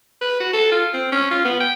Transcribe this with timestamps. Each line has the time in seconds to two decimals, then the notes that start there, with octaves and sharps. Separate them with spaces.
0.21 B4
0.40 F#4
0.53 A4
0.72 F4
0.94 C4
1.12 C#4
1.31 F4
1.45 B3
1.60 G5